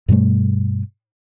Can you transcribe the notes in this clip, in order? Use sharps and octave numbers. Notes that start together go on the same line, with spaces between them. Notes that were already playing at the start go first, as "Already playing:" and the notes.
G2 B2 G3 A3